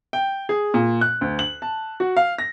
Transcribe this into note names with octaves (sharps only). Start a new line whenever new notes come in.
G5
G#4
A#2
F#6
D2
F#7
A5
F#4
F5
A#6